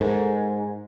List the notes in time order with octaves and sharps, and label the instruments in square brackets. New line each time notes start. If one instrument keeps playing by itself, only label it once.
[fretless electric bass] G#2 [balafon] A4 A#4